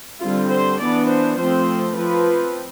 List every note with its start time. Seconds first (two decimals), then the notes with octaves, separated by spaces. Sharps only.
0.22 D3 G3 C4 F4
0.51 C5
0.80 E3 B3 D4 D5
1.09 C5
1.38 F3 A3 C4 C5
1.96 F3 C4 B4